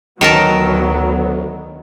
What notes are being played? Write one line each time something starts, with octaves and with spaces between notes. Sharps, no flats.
D2 D#3 F#3 B3 A#4 A5